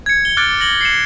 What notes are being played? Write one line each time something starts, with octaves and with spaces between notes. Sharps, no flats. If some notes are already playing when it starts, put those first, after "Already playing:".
G#6 C#7
G7
D6 F6 F#6 A6 C#7 D7
A#6 F#7 G7
C7 C#7 E7